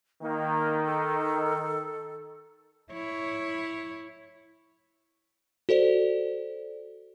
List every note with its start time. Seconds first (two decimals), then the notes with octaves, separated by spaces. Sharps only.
0.21 D#3 A#3
0.85 A4
2.92 E4 C#5
5.69 F#4 A4 C5 D5